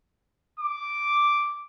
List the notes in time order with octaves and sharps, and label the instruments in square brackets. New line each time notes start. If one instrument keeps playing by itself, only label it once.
[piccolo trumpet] D6